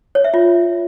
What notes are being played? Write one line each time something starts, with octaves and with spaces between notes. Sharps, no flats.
C#5
E5
F4